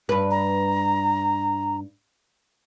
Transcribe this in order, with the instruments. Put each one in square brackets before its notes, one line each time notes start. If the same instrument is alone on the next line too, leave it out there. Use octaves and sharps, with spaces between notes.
[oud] G2 B4
[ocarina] A#5